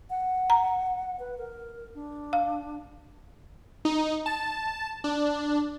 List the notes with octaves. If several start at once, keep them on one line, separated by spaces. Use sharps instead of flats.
F#5
A#5
B4
A#4
D4
F5
D#4
A5
D4